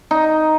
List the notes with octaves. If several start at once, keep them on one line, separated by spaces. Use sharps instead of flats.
D#4